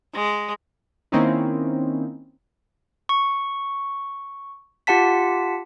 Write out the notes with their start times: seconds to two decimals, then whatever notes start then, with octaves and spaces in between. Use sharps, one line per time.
0.14 G#3
1.12 D#3 A#3 C4 C#4 D#4 E4
3.09 C#6
4.87 F4 G4 F#5 A5 B6